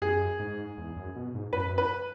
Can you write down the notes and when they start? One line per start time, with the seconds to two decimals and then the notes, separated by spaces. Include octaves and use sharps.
0.02 F#2 G#4
0.40 G#2
0.78 E2
0.96 F#2
1.16 B2
1.34 G#2
1.53 F#2 B4
1.78 B4